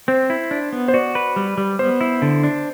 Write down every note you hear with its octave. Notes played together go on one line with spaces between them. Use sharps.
C4 C5
E4
D4
B3
C5
F#4 D5
B4
G3
G3
B3 C5
E4
D3
D4